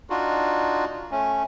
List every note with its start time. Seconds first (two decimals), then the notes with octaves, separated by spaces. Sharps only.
0.10 D4 D#4 F4 F#4
1.11 A3 C#4